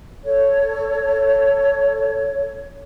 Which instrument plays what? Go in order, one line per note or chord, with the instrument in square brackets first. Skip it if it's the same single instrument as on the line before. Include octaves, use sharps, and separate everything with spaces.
[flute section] A4 C#5